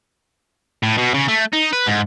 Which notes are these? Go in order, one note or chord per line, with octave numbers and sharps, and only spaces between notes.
A2
B2
C#3
A3
D#4
B4
G#2